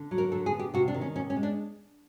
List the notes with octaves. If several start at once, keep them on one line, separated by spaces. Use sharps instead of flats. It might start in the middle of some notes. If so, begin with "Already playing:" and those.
Already playing: D3
F#3
A#4
D3 A4
G#4
B3
G4
C3 F#4
D4
D#3
C#4
C3 C#4
C#4
G#3
D4